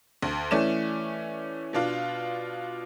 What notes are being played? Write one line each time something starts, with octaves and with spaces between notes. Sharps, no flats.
D2
E3 A3 C#4 D5 E7
B2 D4 F4